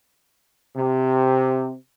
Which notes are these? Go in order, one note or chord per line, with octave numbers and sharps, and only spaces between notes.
C3